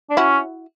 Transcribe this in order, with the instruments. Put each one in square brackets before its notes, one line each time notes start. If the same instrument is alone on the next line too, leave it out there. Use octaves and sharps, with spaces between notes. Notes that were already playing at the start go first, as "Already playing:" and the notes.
[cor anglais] D4
[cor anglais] C#4 [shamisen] E4 F#4